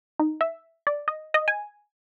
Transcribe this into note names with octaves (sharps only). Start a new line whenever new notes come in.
D#4
E5
D5
D#5
D#5
G#5